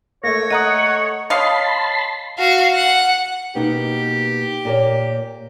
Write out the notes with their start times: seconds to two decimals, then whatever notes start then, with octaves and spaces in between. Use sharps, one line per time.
0.23 A3 A#3 C#5 A#6
0.51 A3 D#5 F#5 A#5 D#6
1.30 C#5 D#5 F5 A5 B5 C6
2.39 F#4 F5
2.74 F#5
3.55 B2 A#3 D#4 G4
4.65 A#2 A#4 C#5